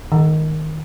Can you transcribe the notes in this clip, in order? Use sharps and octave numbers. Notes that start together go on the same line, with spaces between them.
D#3